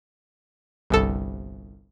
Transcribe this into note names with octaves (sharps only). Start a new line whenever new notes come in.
G1 C2 A4